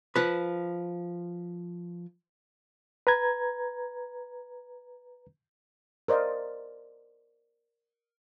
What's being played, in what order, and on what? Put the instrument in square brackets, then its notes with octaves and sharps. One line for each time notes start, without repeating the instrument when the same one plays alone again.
[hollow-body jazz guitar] F3 B4
[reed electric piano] B4 A#5 G#6
[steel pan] A#4 C5 D5 D#5 F5